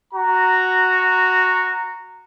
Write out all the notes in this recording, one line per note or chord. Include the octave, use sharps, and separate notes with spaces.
F#4 A#5